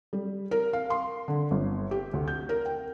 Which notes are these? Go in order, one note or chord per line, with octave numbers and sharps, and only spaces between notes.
G3
A#4
F5
C6
D3
G1
G4
D2
G6
A#4
G5